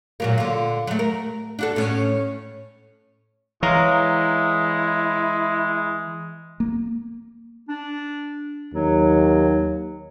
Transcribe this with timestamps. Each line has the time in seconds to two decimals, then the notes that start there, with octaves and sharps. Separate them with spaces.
0.20 A#2 F#3 A#3
0.38 D3 F4
0.87 F#3 A3
0.99 A#4
1.59 D4 F#4 A4
1.76 A2 C#4
3.63 E3 G#3 E4 C#5 F5 A#5
6.60 A#3
7.68 D4
8.74 D#2 F#3